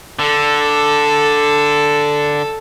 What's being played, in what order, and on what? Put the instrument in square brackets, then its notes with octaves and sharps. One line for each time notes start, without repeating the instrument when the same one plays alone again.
[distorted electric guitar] D3 [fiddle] A4